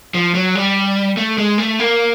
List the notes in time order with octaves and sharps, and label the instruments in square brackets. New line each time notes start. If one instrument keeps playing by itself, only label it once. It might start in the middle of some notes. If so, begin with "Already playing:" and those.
[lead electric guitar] F3
F#3
G3
A3
G#3
A3
A#3